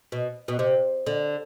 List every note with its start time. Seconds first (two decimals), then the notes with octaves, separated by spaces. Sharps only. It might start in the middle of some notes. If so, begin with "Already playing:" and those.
0.12 B2
0.48 B2
0.59 C3
1.06 D3